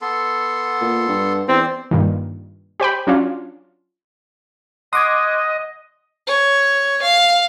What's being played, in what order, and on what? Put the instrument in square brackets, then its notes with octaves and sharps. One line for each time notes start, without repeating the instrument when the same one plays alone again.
[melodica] B3 A4 C6
[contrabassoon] A#2
G2
[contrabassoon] E2 [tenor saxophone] C4 [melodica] D5
[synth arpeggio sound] G2 A#2 D#3
G4 C5 G5 B5
F#3 C#4 D4 F4
[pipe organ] D#5 [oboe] F#5 [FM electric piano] C6 D6 G#6 [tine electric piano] D#6
[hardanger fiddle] C#5
F5